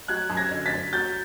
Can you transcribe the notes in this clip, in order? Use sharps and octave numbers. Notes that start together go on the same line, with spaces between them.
F#3 F#6 G#6
F#2
G#6 A#6
D3
A6 B6
F#2
F#3 G6 A6